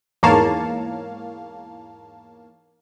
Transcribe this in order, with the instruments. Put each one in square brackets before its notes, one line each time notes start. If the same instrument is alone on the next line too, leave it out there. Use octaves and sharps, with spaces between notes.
[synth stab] E2 G#2 A#3 C#5 F5 A5